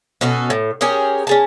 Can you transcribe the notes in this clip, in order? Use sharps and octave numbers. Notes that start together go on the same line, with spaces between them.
B2 C#4 F#4 A4
A2
C#4 G4 G#4 A#4
C#4 G#4 A5